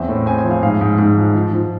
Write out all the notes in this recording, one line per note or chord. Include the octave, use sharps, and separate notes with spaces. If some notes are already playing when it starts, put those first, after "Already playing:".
Already playing: E2 C4 E5
A2
C4 G#5
G#5
F3
F5
G#2 F5
G#2
G#2
F3
F3
F3